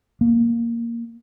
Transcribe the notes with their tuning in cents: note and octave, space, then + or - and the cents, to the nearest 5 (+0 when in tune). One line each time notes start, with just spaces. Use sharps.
A#3 +0